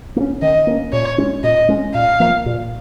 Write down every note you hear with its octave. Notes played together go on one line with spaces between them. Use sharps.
A#3
C#4
D#3 D#5
A#3 C#4
A#2 C#5
G#3 C#4
A#2 D#5
G#3 C#4
A#2 F5
F3 A#3
A#2